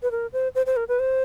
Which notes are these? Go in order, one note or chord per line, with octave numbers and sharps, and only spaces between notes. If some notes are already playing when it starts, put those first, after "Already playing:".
B4
A#4
C5
C5
C5
A#4
B4
C5